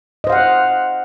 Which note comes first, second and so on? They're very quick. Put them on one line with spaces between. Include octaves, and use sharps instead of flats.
D#5 C5 F5 F#5